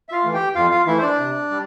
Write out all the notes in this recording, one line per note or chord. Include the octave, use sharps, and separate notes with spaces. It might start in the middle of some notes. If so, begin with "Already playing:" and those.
E5
F4 F5
E3 A3
G4 G5
F2 F4 F5
F4 F5
E3 A3 E4 E5
C5
D4 D5
C3
G3